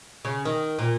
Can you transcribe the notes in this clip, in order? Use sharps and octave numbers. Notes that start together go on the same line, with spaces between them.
C#3
D#3
A#2